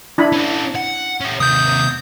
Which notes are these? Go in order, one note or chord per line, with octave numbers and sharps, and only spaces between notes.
D4 E4 B5
C#4 A4
F#5
C#4 G4
D#2 C3 D#6 G6